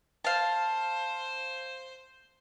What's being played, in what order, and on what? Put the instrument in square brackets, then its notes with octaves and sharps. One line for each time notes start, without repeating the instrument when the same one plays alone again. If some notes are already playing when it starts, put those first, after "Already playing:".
[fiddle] C5 [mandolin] F5 A5